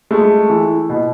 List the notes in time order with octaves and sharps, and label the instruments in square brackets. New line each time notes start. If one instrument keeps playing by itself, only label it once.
[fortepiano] G#3 [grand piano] A3
[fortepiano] E3
B2